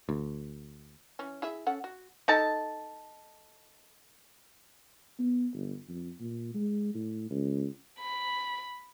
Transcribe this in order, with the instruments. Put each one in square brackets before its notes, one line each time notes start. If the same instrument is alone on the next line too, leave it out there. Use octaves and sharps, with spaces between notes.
[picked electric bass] D2
[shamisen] E3 C#4
E4 G#4 E5
C#4 A4 F#5
F#4
[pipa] D#4 A4 A5
[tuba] B3
G1
F2
A#2
G#3
A2
C#2
[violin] B5